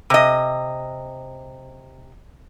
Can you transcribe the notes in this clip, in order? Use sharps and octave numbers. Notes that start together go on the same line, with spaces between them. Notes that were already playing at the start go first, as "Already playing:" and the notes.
C3 D#5